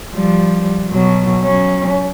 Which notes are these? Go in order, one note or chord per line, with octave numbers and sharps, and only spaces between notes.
F3 G3
B2 F#3
F#3 C#4